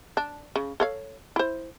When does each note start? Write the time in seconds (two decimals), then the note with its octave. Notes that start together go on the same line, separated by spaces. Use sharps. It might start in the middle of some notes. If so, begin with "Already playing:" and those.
0.17 D4
0.56 C#3
0.80 A4 C#5 F5
1.36 E4 C5